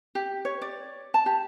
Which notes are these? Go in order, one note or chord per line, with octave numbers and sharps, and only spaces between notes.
G4
C#5
D5
A5
G4